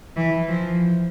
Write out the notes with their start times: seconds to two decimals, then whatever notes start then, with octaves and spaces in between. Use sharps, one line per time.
0.16 E3
0.48 F3